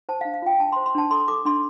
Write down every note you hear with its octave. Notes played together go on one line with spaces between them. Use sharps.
C5 A5
F5
D4
F5
F4 G5
D4 A5
C6
C5
C6
D4 A5
A4 C6
A4 D6
D4 C6